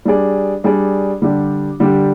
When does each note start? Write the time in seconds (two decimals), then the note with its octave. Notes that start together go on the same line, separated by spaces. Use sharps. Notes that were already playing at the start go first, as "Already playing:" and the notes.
0.05 G3 D4 G#4 D5
0.64 G3 D4 G#4 D5
1.22 D3 G3 D4 G4
1.80 D3 G3 D4 G4